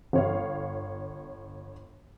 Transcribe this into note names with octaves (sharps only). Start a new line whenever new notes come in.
G1 C#5 F5